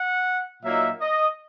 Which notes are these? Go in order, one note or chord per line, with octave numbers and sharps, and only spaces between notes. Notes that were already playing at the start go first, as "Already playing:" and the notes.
Already playing: F#5
A#2 F#3 A#3 D#4 E5
D#5